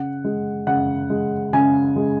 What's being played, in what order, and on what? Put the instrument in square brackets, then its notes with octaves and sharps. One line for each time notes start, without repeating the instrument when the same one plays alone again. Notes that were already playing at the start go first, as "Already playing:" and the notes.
Already playing: [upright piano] C#3 F#5
G#3
C#3 F#5
G#3
C#3 G#5
G#3